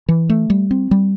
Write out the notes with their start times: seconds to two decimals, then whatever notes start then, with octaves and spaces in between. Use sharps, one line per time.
0.09 E3
0.29 A3
0.50 G3
0.71 C4
0.91 G3